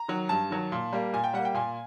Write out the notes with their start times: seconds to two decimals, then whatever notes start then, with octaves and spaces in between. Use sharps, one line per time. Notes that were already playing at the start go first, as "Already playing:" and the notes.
Already playing: A#5
0.08 D#3 F#3
0.29 G2 A5
0.50 D#3 F#3
0.72 A#2
0.93 G3 A#3
1.13 A#2 G#5
1.24 G5
1.34 G3 A#3 F#5
1.45 G5
1.54 A#2 G#5